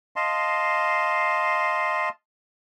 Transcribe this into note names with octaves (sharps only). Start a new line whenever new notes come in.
D#5 F5 A5 C6